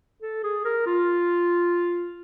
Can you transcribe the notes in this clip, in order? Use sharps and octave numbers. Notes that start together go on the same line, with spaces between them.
A4
G#4
A#4
F4